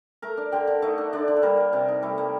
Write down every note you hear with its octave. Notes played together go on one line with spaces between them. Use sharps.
A3 A#4 A#5
D4
D3 G4 G5
D3
A3 D#4 D#5
D4
D3 D4 D5
D3
A4
G3 A#3 A#4
A#3
C3 G4
D#4
G3 A3 A4
A#3